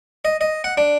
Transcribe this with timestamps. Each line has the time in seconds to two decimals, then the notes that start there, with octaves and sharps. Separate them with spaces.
0.25 D#5
0.41 D#5
0.64 F#5
0.77 D4